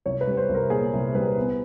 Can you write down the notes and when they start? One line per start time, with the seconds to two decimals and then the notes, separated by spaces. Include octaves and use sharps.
0.06 C2 C#5
0.21 B4
0.27 G3
0.37 C5
0.49 C2
0.55 A#4
0.70 A#2 G#4
0.93 C2
1.14 G3 B4
1.37 B3